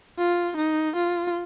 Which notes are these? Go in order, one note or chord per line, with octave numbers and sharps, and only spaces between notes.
F4
D#4
F4